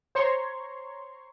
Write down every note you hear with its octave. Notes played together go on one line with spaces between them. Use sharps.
C5 C#5 A#5 C6 C#6